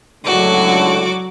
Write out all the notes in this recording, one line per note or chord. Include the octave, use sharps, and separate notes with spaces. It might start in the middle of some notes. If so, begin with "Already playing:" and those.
C#2 A2 D3 F#3 F#4 D6